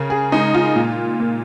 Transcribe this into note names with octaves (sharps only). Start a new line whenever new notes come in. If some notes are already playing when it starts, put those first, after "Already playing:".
Already playing: C#3 A#4
G#4
G#3 D#4
F4
A#2
A#3